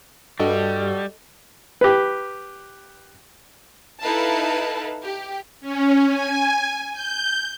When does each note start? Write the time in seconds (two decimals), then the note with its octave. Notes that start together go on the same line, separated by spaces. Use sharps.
0.40 G2 G3 F#4 A4 D#5
1.81 G4 B4
4.00 D#4 E4 A4 B4 F5 A5
5.03 G4
5.61 C#4
6.09 G#5
6.94 G6